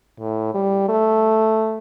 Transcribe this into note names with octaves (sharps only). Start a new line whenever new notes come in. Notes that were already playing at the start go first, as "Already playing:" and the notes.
A2
G3
A3